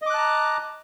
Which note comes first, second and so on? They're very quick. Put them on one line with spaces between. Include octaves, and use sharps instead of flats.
D#5 D6 F#6 A5 A#5